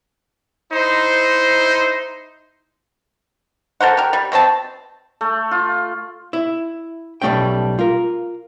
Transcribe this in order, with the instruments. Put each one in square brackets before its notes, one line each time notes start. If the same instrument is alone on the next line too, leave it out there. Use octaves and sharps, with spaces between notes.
[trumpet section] D#4 E4 C5
[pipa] A4 A#4 C5 F#5
G4 A#4
G3
B2 C4 D4 A5
[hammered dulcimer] A3
F4
[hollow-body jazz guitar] E4
B1 G3 A3 C#4 G5
F4 A#4